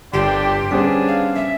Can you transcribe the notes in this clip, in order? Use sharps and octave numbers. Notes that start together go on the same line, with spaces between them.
G1 D4 G4 G5 C6
G3 B3 C#4 D4 G#4 C5
F5
E5